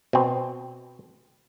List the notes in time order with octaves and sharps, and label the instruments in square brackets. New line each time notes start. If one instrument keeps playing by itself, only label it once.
[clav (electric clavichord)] B2 C4